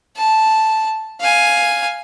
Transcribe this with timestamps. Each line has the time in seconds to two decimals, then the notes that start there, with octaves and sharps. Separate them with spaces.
0.17 A5
1.20 F5 G#5